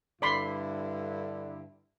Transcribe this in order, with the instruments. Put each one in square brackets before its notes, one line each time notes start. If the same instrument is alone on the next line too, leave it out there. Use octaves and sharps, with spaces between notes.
[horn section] G2 D3 E4 [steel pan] D5 B5 C6